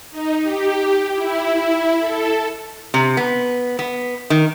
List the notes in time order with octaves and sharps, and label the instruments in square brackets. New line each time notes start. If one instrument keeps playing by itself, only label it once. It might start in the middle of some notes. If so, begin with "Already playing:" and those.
[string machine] D#4
G4
E4
A4
[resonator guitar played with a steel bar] C3
B3
B3
D#3